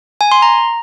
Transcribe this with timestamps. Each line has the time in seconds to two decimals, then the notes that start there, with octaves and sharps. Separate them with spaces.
0.21 G#5
0.32 C6
0.42 A#5